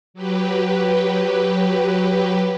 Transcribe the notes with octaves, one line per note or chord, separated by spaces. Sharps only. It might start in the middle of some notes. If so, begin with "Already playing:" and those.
F#3 G4 B4